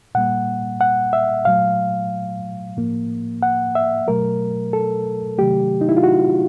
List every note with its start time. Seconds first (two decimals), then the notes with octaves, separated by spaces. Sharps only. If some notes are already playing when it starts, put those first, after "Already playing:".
0.15 A#2 G3 A#3 F#5
0.81 F#5
1.13 E5
1.45 A#2 F#3 A3 F5
2.77 A2 F3 A#3
3.42 F#5
3.75 E5
4.07 B2 F#3 A3 A#4
4.73 A4
5.38 C3 D#3 F#3 A3 G4
5.81 D#4
5.89 E4
5.97 F4
6.04 F#4